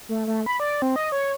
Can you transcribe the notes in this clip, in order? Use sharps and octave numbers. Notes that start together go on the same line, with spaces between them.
A3
A3
B5
D5
C4
D#5
C#5